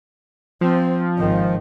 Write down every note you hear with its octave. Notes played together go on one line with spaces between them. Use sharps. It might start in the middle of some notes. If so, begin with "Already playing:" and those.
F3 C4
G#1 D#3